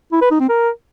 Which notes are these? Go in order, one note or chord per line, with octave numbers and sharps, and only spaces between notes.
E4
B4
D#4
C4
A#4